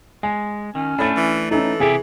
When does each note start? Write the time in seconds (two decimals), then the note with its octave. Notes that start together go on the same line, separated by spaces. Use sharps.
0.23 G#3 G#5
0.75 D#3 C#4
0.99 A2 A3 D4 B5 A6
1.16 E3
1.51 E3 C#4 D#4 A4
1.80 C3 E4 G4 G#4